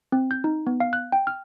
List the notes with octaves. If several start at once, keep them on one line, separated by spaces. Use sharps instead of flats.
C4
G6
D#4
B3
F5
F#6
G5
F6